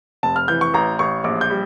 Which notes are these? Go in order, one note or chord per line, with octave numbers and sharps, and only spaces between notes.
F1 A5
F6
E3 G6
C#6
A1 A#5
A1 C#6
A#1 D6
G6
G3